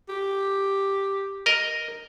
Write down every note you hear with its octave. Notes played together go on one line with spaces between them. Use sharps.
G4
A#4 D#5